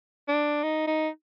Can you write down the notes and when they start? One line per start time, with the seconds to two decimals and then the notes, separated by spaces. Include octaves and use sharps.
0.28 D4
0.63 D#4
0.87 D#4